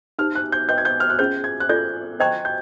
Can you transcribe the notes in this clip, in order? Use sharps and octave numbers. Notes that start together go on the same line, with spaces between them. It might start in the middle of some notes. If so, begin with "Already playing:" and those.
D#4 G4 C5 F6
F#6
G6
B4 D#5 G5 C6 G6
G#6
G6
F6
F#6
C#4 F4 G#4 C5 G6
G#6
F#6
F4 A4 D5 G6
C5 D#5 G5 A#5 C#6 G#6
G6